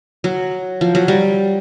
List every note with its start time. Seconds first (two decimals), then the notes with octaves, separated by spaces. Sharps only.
0.24 F#3
0.81 F3
0.95 F#3
1.08 G3